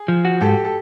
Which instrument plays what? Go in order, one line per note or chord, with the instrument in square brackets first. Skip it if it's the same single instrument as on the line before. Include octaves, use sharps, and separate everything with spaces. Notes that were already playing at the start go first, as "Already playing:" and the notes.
Already playing: [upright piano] G#4
[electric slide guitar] F3
F#4
[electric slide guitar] G#2 [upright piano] G4 A4
[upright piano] A4